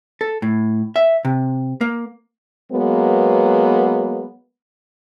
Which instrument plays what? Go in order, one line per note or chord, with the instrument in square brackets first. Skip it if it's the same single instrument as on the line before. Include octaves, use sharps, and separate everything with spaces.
[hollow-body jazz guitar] A4
A2
E5
C3
A#3
[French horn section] F#3 G#3 A#3 B3